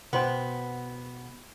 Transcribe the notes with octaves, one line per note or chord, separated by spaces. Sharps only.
B2 B3 C5 G5